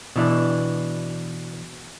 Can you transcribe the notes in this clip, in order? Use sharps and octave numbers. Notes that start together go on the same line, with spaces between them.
B2 E3 D4